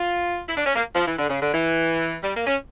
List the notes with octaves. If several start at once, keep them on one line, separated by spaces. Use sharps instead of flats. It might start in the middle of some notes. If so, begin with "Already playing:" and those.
Already playing: F4
E4
D4
C#4
A#3
F3
E3
D3
C#3
D3
E3
G3
A#3
C#4